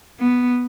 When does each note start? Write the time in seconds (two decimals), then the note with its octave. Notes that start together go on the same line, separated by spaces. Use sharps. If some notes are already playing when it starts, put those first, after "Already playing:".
0.20 B3